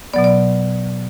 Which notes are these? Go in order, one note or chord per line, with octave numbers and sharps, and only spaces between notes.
B2 F#3 B3 D5
D5